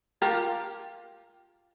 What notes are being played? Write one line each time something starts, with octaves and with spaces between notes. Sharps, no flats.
F4 G4 A#4